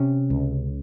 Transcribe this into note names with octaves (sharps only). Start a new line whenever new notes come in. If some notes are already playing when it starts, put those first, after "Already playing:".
Already playing: C3 C#4
C#2